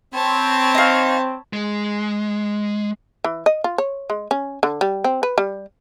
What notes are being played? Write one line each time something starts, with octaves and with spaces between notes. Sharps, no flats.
C4 C#5 A5 B5
D#4 F5
G#3
E3
D#5
F4
C#5
G#3
C#4
D3
G3
C4
B4
G3